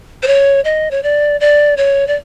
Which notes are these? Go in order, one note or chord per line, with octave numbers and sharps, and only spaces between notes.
C5
C#5
D#5
C#5
D5
D5
C#5
D5